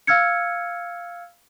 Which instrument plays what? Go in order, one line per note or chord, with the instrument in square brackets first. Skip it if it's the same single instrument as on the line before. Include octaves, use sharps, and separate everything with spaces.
[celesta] F5 E6 F6 G#6 C#7